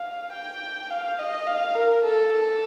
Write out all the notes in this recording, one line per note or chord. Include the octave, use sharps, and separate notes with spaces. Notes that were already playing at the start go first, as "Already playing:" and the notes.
Already playing: F5
G5
F5
D#5
F5
A#4
A4
A4